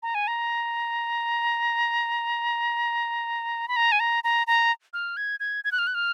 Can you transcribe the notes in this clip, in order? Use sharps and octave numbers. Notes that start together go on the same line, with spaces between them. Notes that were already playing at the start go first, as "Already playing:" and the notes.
A#5
G#5
A#5
B5
A#5
G#5
A#5
A#5
A#5
F6
G#6
G#6
G#6
F#6
F6
F#6
F6